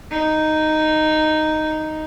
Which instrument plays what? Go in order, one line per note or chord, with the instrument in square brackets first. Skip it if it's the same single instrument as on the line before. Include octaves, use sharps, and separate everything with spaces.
[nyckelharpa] D#4